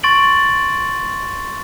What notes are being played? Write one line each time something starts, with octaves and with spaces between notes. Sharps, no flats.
C6 C#6 A6 D7 F#7